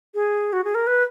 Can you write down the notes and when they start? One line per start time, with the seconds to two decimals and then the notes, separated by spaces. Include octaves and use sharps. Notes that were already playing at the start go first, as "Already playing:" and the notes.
0.14 G#4
0.53 F#4
0.64 G#4
0.75 A#4
0.87 B4